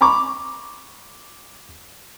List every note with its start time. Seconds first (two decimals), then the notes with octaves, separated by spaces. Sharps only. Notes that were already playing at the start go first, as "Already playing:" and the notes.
0.01 A#5 B5 C#6 D6